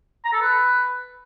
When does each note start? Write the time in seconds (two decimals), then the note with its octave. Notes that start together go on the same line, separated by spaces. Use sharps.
0.25 A#5
0.33 A4
0.41 B4